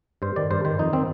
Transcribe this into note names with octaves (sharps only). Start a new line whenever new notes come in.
G2 C5
D#3 D5
G2 C5
D#3 C5
F2 D#4
D#3 C4